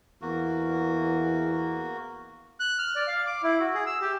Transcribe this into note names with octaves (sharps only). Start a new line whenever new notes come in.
E2 A#3 F#4
F#6
F6
D5
F5
D6
E4
F#4
G#4
E6
G4